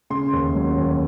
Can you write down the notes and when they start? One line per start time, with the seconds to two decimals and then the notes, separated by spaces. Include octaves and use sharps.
0.10 C#3 C6
0.33 D#2
0.55 F#3
0.78 D#2